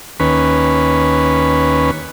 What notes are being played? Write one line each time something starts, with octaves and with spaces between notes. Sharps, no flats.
D#2 C#4 B4